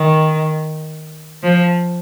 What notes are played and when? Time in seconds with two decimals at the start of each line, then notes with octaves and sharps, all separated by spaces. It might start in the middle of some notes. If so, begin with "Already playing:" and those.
Already playing: D#3
1.43 F3